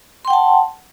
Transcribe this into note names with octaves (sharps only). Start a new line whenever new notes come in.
F#5 G5 A5 C6